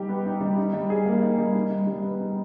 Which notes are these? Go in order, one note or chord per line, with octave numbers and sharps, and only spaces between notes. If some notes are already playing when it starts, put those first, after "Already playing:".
Already playing: G3 D#4 G4
B3
D#4
G3
D#4
G3
G#4
A#3
D#4
G3
D#4
G3
G3
B3
D#4